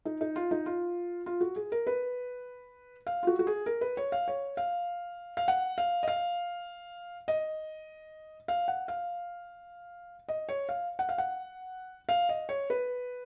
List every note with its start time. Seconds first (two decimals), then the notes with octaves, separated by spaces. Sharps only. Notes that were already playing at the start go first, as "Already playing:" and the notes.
0.05 D#4
0.21 D#4
0.36 F4
0.51 D#4
0.66 F4
1.26 F4
1.41 F#4
1.56 G#4
1.72 A#4
1.87 B4
3.07 F5
3.23 F4
3.27 F#4
3.39 F#4
3.47 G#4
3.66 A#4
3.81 B4
3.97 C#5
4.12 F5
4.28 C#5
4.57 F5
5.37 F5
5.48 F#5
5.78 F5
6.03 D#5
6.08 F5
7.28 D#5
8.48 F5
8.68 F#5
8.88 F5
10.29 D#5
10.49 C#5
10.69 F5
10.99 F#5
11.09 F5
11.18 F#5
12.09 F5
12.29 D#5
12.49 C#5
12.70 B4